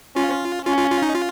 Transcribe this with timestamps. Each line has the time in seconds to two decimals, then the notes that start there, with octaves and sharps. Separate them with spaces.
0.16 C#4 F4
0.65 C#4 F4
0.78 F4
0.91 F4
1.02 D#4
1.15 F4